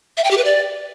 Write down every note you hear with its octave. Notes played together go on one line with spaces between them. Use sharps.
E5
G5
G4
B4
D5